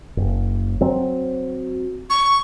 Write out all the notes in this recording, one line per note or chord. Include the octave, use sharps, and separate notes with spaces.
F#1
F#3 C4
C#6